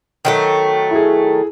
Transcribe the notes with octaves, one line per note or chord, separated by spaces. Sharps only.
D#3 F#3 A3
E4 G#4